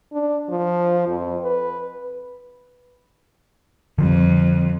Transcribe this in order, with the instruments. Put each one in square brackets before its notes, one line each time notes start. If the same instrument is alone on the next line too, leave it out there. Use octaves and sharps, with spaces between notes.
[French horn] D4
F3
F2
B4
[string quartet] F2 [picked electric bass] D3 F3 G3